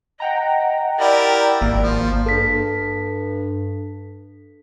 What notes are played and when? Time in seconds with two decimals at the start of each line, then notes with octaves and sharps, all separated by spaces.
0.20 D#5 F#5 G5 A#5
0.99 E4 G4 A#4 D5
1.61 G#1 A#3
1.82 F3
2.26 G2 A4 B6